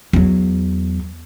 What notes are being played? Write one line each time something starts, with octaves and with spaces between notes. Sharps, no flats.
E2 F#3